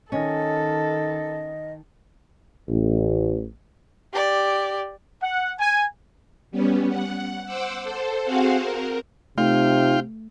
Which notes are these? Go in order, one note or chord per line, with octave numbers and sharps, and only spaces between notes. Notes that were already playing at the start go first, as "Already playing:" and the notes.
D#3 C#4 A4 D#5
A1
G4 D5
F#5
G#5
G3 B3 C#4
F#5
C5 F#5 D6 E6
A4 C5
C4 F#4 G#4 C5 F5 F#5
A#4
C3 A3 D#4 F4 F5 G5